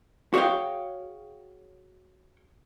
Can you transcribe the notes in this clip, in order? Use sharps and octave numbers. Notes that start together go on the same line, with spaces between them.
F#4 G#4 C#5 E5 F5 G5